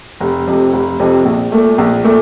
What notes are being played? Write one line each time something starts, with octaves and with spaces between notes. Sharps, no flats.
F1
F2 C3
F1
F2 C3
A#1
A#2 A3
A#1
A#2 A3